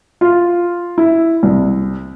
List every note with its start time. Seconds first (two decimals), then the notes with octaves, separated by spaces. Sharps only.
0.21 F4
0.98 E4
1.43 C2